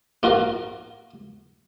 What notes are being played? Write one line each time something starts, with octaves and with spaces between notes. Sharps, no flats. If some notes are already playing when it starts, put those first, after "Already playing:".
A#3 F4 F#4 A#4